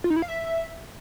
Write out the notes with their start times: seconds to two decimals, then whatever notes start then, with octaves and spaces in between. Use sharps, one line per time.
0.04 F4
0.10 D#4
0.16 E4
0.22 F5
0.28 E5